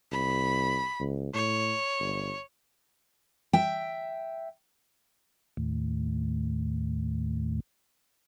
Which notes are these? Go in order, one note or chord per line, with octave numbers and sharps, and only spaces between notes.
C2 B5
C#2
A2 C#5
G1
E5 G5
D#2 A2